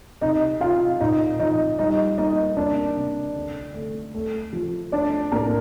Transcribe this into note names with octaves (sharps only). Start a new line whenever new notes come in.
C3 D#4 D#5
C3 F4 F5
A#2 D#4 D#5
F3 D#4 D#5
G3 D#4 D#5
A#3 D#4 D#5
A#3 D4 D5
C3
D3
A3
A3
F3
A3 D4 D5
A2 A#3 A#4